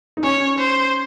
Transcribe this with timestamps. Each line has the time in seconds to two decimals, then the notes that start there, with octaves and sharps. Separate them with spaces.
0.17 D#4
0.23 C#4 C#5
0.59 C5